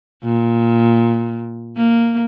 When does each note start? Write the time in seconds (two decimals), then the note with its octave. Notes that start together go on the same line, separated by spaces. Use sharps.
0.24 A#2
1.77 A#3